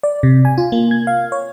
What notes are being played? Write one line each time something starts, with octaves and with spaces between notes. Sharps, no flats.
D5
C3
G#5
F4
A#3
G#6
F5
C#5